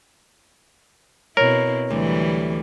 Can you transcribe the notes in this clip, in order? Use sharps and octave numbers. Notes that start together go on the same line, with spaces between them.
B2 C4 E4 A#4 C#5
D2 E3 F#3 G3